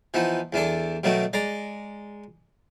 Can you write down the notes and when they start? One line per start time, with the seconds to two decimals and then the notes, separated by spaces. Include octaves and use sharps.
0.14 E3 F3 B3 D#4
0.53 E2 E3 D4 A4
1.04 B2 D#3 F#3 A3 F#4
1.33 G#3 D5 A#5